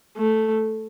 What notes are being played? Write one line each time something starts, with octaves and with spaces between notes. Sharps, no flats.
A3